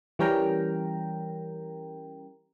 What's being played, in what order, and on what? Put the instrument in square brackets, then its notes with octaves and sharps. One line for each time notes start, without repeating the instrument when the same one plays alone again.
[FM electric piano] E3 G3 C#4 A#4 G5 A#5